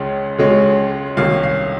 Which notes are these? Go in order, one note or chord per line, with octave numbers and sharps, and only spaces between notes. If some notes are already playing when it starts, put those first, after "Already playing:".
Already playing: C#2 C#3 G#3 C#4
C#2 C#3 G#3 C#4
C2 C3 D#3 A#3 C#4 F5
F5